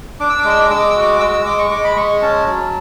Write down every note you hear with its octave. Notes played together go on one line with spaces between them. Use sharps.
D4 D6
E6
D6
G#3
E6
D6
G#3 E6
D6
E6
F#4 D6
G#3 E6
E6
G#3 D6
C#6
G#3 D6
B5
G#3 C#6
C#4 A5
F#3